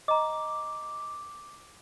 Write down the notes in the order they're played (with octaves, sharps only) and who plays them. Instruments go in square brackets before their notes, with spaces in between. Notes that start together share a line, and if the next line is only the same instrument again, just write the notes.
[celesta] D#5 A#5 [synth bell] D6